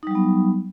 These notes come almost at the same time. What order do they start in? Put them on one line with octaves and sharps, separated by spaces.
D#4 G3 F#3 B3